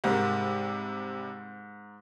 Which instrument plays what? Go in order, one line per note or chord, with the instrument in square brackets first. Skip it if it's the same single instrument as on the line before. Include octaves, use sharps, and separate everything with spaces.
[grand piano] G#2 A#4 [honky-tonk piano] C3 G3